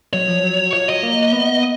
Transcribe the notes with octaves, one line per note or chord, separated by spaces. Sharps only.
F#3 C#5
F3
F#3
F3 C#5
F#3 D#5
A#3
B3